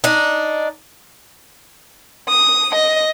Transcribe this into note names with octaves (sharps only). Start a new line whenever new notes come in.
D4 D#4
D#6
D#5